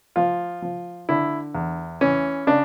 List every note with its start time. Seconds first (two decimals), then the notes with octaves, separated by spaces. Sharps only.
0.16 F3 F4
0.62 F3
1.09 D3 E4
1.55 E2
2.01 E3 C#4
2.47 C#3 D4